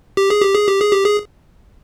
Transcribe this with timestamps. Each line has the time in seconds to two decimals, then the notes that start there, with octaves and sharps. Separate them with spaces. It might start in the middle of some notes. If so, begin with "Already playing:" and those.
0.17 G4
0.30 G#4
0.42 G4
0.55 G#4
0.68 G4
0.80 G#4
0.92 G4
1.05 G#4